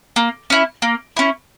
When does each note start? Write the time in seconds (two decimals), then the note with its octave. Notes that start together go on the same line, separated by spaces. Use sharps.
0.16 A#3
0.50 C#4 E4
0.82 A#3
1.17 C#4 E4